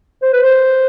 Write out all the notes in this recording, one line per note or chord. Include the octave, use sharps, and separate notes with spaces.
C5
B4
C5